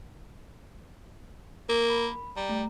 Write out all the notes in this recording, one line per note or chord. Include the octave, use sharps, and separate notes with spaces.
A#3 A#4
B5
G3 A#5
A3